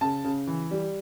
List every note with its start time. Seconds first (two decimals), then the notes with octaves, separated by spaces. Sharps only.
0.01 C#3 A5
0.24 C#3
0.47 E3
0.71 G3